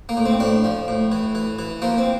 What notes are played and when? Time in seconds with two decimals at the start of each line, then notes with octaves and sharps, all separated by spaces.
0.09 A#3
0.17 A2
0.25 C4
0.40 A2 D4
0.64 F3
0.88 A2
1.12 E3
1.35 E3
1.59 E3
1.82 F3 A#3
1.98 C4